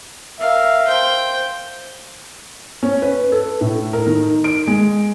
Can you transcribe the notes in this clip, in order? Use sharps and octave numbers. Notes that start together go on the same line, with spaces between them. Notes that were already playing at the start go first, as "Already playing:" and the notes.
A#4 E5 F5
C5 G5
C#4
B4
A4
A2
A#4
D#3
D7
G#3